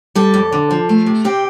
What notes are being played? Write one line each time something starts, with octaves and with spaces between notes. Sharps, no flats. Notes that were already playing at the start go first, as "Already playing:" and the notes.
G3 A4
F2
D3
F3
A3
C3
C4 G4